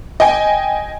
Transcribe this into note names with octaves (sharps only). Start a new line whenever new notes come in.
D#5 G5 G#5